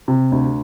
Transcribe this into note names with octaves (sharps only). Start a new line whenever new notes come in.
C3
D2